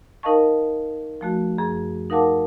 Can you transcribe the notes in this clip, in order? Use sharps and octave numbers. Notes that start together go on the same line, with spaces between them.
D#4 A#4 D#5 F5 A5 C#6
F3 A3 F#4
F#2 G#4
D#4 A#4 F5 F#5 A5 D6